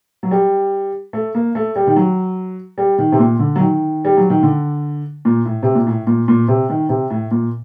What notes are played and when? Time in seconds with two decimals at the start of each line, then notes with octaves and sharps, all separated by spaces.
0.23 F#3
0.31 G3
1.13 A3
1.35 A#3
1.55 A3
1.76 G3
1.87 D#3
1.96 F#3
2.78 G3
2.98 D#3
3.12 C3
3.19 A#2
3.39 D3
3.56 F#3
3.60 D#3
4.05 G3
4.17 F#3
4.30 D#3
4.43 D3
5.25 A#2
5.45 A2
5.63 C3
5.75 A#2
5.87 A2
6.07 A#2
6.28 A#2
6.48 C3
6.69 D#3
6.89 C3
7.10 A2
7.31 A#2